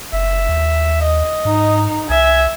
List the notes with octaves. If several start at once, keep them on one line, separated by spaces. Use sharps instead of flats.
F#1 E5
D#2
D#5
G#2 D#4
C2 E5 G#5